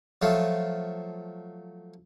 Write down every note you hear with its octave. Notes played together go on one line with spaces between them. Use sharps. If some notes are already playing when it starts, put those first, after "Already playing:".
F3 F#3 A3